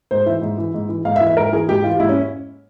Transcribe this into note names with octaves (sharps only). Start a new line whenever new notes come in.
G#2 C5
E3 E5
G#2
E3
G#2
E3
G#2 F5
E5
E3
E5
G#2 A#4
E3 G#4
G#2 G4
E3 F4
G#2 E4
C#4